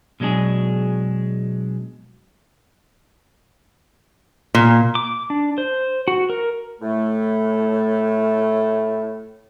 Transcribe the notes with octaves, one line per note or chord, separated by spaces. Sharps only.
B2 F#3 G#3 D4 G#4
A#2
D6
D4
C5
F#4
A#4
A2 A3